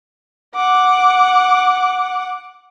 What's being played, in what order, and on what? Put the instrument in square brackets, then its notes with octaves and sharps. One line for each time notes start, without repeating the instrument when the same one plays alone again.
[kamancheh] F#5 D6